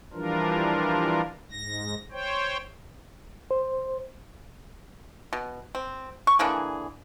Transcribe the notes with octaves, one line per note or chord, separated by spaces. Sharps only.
E3 F3 G3 D4 F4 A#4
G#2 A#6
C5 C#5 G5
C5
B2
C4
C#6
D3 E3 A#3 G#4